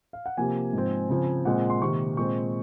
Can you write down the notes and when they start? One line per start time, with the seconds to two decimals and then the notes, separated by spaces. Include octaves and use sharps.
0.13 F5
0.26 F#5
0.37 C3 F3 A#3 G#5
0.73 G#2 F3 C4
1.10 C#3 F3 C4
1.45 A#2 G#3 C4 F#5
1.70 C6
1.81 C3 D#3 A#3 C#6
2.17 A#2 G#3 C4 C#6